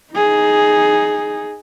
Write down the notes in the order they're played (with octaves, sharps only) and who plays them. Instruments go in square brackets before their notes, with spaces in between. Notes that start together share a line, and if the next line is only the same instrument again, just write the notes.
[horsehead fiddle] D#4 G#4